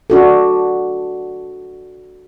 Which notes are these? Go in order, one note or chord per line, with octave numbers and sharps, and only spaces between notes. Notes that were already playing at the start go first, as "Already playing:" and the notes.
D4 F#4 A4